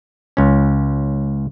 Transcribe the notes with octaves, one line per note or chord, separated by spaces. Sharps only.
C#2 C#4